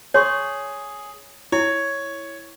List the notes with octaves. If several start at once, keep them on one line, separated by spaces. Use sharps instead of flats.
G#4 C#5 C6 C#6
E4 C#5